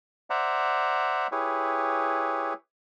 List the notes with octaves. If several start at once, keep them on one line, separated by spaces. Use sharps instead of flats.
C5 D5 E5 F#5 A#5
E4 G4 G#4 B4 C#5